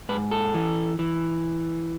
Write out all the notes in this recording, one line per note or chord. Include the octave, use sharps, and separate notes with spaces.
G#2 B4
A4
E3
E3